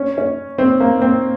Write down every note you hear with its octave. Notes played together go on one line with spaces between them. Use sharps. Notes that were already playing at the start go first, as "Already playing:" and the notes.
Already playing: C#4
C#4
C4
A#3
C4